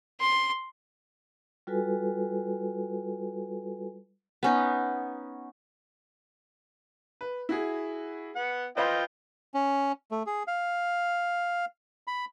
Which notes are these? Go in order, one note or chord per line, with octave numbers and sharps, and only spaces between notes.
C6
G3 F4 F#4 A4 B4 G#5
B3 C#4 D#4
B4
E4 F#4 G#4
B3 F#5
F4 B4 C5 D#5 G5 B5
C#4
A3
G#4
F5
B5